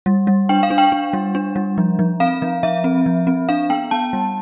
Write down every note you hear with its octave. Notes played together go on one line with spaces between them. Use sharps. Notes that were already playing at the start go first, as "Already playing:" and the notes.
G3
G3
D4 G5
F5
D4
G5
D4
G3
D4
G3
F3
F3
C4 F5
F3
F3 E5
C4
F3
C4
D4 F5
B3 G5
B3 A5
G3